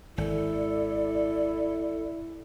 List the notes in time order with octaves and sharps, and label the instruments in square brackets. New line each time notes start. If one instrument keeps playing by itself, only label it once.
[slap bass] G#1 [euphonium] E4 [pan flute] A4 [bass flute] D5